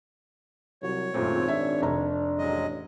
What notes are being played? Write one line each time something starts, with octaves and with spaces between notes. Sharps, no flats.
C2 F#3 C#5
G#1 F#2 A#2 A3 C4
D4 E5
F1 A#5
A1 F#3 G#3 D#5